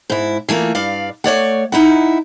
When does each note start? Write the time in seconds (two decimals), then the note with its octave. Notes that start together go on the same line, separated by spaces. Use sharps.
0.10 G#2 E4
0.49 E3 A3 A#3 F4
0.75 G2 D5 F5
1.24 A3 C#5 D5 F#5
1.72 D#4 E4 F#5